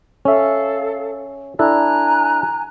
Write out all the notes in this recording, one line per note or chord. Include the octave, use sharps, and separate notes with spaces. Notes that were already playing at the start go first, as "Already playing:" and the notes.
C#4 A4 E5 F5
D4 E4 A4 G#5 A#5 F#6